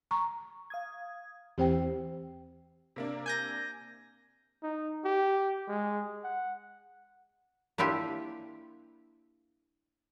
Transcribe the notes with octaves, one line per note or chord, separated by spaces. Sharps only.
A#5 C#6
F5 D#6 G#6
E2 E3 C4 G4 C5 G5
C3 A#3 D4
G#5 G6 A#6
D#4
G4
G#3
F#5
A#3 D4 E4 F4 G4